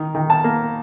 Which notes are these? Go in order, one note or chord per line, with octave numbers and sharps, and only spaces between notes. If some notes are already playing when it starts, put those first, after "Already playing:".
Already playing: D#3
D#3
A5
A#3